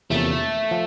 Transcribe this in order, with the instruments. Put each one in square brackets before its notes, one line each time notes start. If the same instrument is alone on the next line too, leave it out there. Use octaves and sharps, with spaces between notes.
[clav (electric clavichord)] E2 C3 F3 A#3 C#4 [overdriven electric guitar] A3
[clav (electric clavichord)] F3